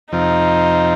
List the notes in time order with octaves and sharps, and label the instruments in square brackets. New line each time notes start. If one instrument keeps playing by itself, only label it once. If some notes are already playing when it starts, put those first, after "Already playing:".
[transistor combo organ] F2 C3 F3 C4 F4 [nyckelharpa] D#4